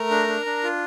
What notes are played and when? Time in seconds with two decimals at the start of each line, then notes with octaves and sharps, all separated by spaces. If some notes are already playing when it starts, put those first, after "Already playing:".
Already playing: A3 A#4 A#5
0.11 D4
0.28 D4
0.46 D4
0.64 F4